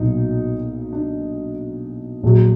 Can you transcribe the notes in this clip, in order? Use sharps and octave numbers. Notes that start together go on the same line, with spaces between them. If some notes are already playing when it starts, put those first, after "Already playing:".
Already playing: B1 A#2 F#3 D#4
D4
A#1 A#2 F#3